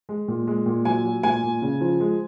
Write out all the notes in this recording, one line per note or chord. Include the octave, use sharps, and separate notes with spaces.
G#3
A#2
G#3
A#2
F#3 G#5
F#3
A#2 G#5
A#2
C#3
F3
G#3